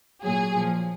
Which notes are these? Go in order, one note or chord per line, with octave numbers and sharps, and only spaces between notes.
A#2 F#3 G#4
A#2 F3